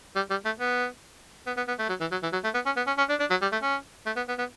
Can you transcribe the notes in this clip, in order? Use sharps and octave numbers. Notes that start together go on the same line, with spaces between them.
G3
G3
A3
B3
B3
B3
B3
A3
F#3
E3
F#3
E3
F#3
A3
B3
C#4
B3
C#4
C#4
D4
D4
F#3
G3
A3
C#4
A3
B3
B3
B3